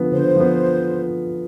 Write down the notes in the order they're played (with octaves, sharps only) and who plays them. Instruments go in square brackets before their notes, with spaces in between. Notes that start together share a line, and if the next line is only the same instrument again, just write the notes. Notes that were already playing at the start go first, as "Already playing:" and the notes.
Already playing: [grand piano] D3 F3 B3
[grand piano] D3 [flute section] C5
[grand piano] F3 B3